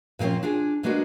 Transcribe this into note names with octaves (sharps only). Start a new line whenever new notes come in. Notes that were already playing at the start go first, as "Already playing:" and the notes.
A#2 F3 A#3 C4 C#4
D4 F4 G#4 G#5
B2 G#3 A#3 B3 D4 F#4